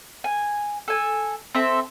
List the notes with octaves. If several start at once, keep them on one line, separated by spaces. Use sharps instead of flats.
G#5
A4 G#5
C4 A4 E5